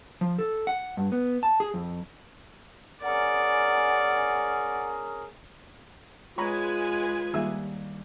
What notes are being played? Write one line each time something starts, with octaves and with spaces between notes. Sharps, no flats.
F3
A4
F#5
G2
B3
A5
G#4
F2
C#4 G#4 A#4 D5 F#5
G#3 F4 B4 C#5 G#5 A#5 B5 C#6
D#2 D#3 G3 G#4 E5